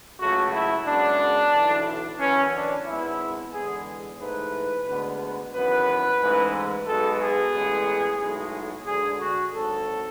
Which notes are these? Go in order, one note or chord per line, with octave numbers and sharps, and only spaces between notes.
C#2 C#3 F#3 A3 F#4
E4
F#2 C#3 G#3 B3 D4
B1 A2 E3
F#2 E3 B3 C#4
D4
G#1 G#2 G#3 B3 E4
E2 D3 G#3 B3 G#4
G#2 E3 A3 B4
D2 D3 G#3 B3
G#1 F#2 E3 B3 B4
A1 G#2 E3 G#3
B1 B2 G#3 B3 A4
G#4
A1 A2 G#3 B3
B1 A2 G#3
D2 D3 G#3 G#4
F#4
G#1 G#2 F#3 A4